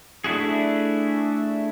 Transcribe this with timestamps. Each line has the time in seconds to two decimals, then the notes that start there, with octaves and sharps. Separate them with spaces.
0.24 A3 D4 E4 F#4 G#4